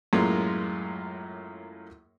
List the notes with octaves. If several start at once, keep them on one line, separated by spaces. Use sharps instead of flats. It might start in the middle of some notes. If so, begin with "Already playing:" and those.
F#2 A2 G#3 A#3 F4